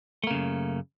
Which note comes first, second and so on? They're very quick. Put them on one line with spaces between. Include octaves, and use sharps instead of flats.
A3 A#3 C#3 F#2